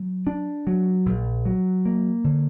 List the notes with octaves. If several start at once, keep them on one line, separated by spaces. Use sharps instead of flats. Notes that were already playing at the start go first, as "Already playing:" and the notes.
Already playing: F#3
D4
F#3
A#1
F#3
A#3
D3